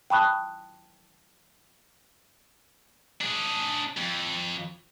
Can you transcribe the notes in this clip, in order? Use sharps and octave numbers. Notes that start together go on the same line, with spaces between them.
G5 A5 B5 C#6 D#6 F#6
D4 G#4
F2